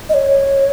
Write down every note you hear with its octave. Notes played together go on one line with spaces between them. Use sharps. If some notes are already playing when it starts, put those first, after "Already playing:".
D#5
C#5